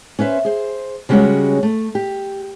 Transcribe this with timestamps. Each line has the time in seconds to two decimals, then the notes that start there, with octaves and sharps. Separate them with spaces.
0.19 C#4 B4 C5 E5
0.45 G#4 C5
1.09 C#3 G3 G#3 C#4 F#4 C#5
1.63 A3
1.95 G4